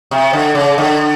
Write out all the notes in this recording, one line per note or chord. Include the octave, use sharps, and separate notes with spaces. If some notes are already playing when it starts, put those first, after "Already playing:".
C3
D3
C#3
D3